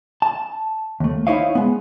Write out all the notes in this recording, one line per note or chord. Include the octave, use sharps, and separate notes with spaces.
A5
D#2 A3
D#4 E4 C5 C#5 D#5 F5
G#3 B3